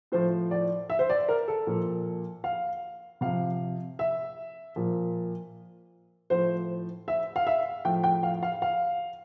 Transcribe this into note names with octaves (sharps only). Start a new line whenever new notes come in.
A2 F3 C5
D5
E5
C5
D5
A#4
A4
A#2 F3
F5
C3 F3 F5
E5
A#2 F3
A2 F3 C5
E5
F5
E5
A2 F3 G5
G5
F5
F5
F5